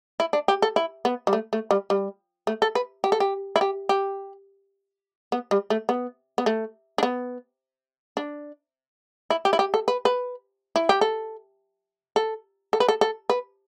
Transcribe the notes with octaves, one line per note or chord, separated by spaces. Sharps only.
E4
D4
G4
A4
E4
B3
G3
A3
A3
G3
G3
A3
A4
B4
G4
A4
G4
E4
G4
G4
B3
G3
A3
B3
B3
A3
D4
B3
D4
E4
G4
E4
G4
A4
B4
B4
E4
G4
A4
A4
A4
B4
A4
A4
B4